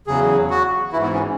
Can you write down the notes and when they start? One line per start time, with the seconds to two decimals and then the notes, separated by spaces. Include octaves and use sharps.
0.07 E2 C#3 F#3 G#4
0.50 F#4
0.92 E3 E4
0.96 G#2
1.03 B3
1.14 C#4